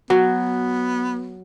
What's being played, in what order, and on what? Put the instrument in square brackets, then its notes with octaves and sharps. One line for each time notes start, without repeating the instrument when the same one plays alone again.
[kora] F#3 [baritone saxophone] B3